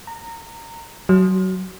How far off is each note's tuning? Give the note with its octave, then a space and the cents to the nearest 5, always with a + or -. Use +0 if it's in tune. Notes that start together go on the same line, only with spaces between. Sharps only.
A#5 -20
F#3 +20